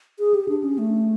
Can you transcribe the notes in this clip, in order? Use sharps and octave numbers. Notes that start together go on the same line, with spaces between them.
G#4
G4
D4
C#4
A3